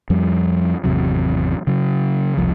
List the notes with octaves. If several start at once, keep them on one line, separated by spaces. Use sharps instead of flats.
F2 F3 G3
G#1 E2 C3 F#3
C#3 F#3
E1 C2 F3